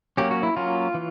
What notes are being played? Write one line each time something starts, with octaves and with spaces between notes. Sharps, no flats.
F#3 A#3 C#4 G4
F#4
E4
F#3 A#3 C#4 F4
E3